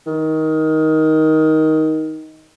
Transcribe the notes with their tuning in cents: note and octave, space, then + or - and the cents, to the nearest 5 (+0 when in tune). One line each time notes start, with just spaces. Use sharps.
D#3 +15